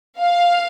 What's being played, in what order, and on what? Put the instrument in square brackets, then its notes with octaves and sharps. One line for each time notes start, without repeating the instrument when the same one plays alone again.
[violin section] F5